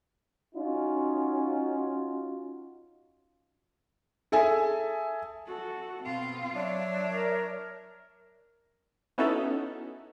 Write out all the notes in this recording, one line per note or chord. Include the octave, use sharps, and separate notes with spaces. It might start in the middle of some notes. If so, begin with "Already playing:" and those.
C#4 D#4 F4 F#4
G#4 A4 E5 G#5
F#4 A4
B2 C4 F4
F#3 D4 C#5 E5
A#4
B3 C#4 D#4 E4 F#4 A4